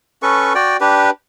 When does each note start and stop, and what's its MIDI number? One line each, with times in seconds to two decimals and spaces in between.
0.22 0.53 61
0.22 0.53 69
0.22 0.53 71
0.22 0.53 85
0.55 0.77 66
0.55 0.77 74
0.55 0.77 79
0.81 1.10 62
0.81 1.10 67
0.81 1.10 71